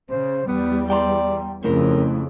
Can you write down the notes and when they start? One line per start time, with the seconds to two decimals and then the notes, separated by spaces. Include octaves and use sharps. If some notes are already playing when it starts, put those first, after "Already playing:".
0.11 C#3 C5
0.47 E2 G3 B3
0.90 D5 G5 A#5 C6
1.64 F2 C#3 A3 E4 A#4 C5